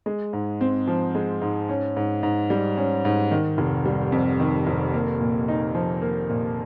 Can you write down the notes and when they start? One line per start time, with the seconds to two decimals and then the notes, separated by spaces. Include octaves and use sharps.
0.06 G#3
0.33 G#2
0.61 C4
0.87 F3
1.15 G#3
1.42 G#2
1.69 C#4
1.97 G#2
2.23 G#2
2.50 G3
2.77 C#4
3.05 G#2
3.31 D#3
3.58 F1
3.86 G3
4.12 F2
4.40 D#3
4.67 F1
4.94 A#3
5.20 A#2
5.48 D#4
5.75 F3
6.02 A#3
6.29 A#2